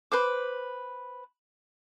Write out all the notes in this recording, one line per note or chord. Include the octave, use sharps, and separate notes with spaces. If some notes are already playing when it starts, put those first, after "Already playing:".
B4 C5 D6